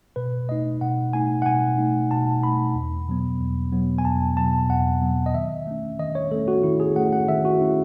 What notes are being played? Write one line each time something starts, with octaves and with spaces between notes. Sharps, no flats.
B2 B4
A3 D#4 D#5
B2 F#5
A3 D#4 G#5
F#5
B2 G#5
A3 D#4
B2 A5
A3 D#4 B5
E2
B2 F#3 B3
E2
B2 F#3 B3
G#5
E2 A5
B2 F#3 B3 A5
E2 F#5
B2 F#3 B3
D#5
D#3 E5
A3 C#4
D#3 D#5
C#5
A3 C#4 A4
F#4
D#3 E4
G#4
A3 C#4 F#5
F#5
D#3 E5
F#4
A3 C#4 E4